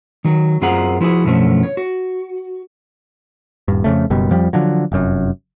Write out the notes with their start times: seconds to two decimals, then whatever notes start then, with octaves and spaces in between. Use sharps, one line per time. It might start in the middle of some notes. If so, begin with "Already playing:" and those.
0.24 D#3 F#3
0.61 F#2 C4 F4 G#4 F#5 A#5
1.01 F3 E4 F#4 G#4
1.25 F#2 B2 D3 F3 A3 C#4
1.63 C#5
1.77 F#4
3.68 D#1 G2
3.84 F2 C#3 A3
4.10 F#1 F#2 B2 G3
4.31 F2 F3 G3
4.53 D3 F3 F#3
4.92 F1 F#2